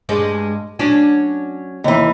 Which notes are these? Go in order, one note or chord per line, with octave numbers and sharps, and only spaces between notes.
G2 G#3 D4
F#3 C#4 D4
D#2 E3